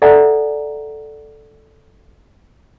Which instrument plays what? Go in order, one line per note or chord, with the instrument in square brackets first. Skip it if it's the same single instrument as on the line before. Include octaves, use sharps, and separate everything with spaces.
[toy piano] A4 D5 E5 F#5 G#5 A#5